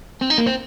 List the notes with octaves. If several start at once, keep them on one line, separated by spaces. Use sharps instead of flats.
C4
D#4
A#3
C4